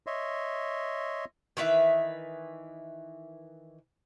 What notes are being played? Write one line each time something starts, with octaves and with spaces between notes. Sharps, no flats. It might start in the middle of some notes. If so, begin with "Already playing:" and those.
C#5 D#5 E5 C6
D#3 E3 B4 E5